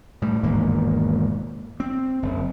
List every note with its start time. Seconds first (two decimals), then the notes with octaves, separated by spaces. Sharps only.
0.22 A2 G3
0.43 E1 G#2 D#3 A#3
1.80 C4
2.22 F#1